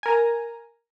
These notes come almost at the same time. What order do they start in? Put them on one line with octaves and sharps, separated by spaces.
G#5 A#4 A#5